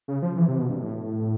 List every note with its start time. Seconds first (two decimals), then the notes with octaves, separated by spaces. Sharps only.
0.08 C#3
0.22 F3
0.37 E3
0.48 C3
0.58 B2
0.70 G2
0.80 A2